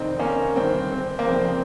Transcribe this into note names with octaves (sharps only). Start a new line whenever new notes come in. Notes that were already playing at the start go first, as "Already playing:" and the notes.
Already playing: F1 D#2 D#3 C4 D#4
A#3 C#4
G1 G2 D#3 C4
C4
A#3
F1 F2 C#3 C4